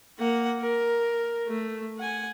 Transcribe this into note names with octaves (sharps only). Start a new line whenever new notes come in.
A#3 F#5
A#4
A3
F#5 G#5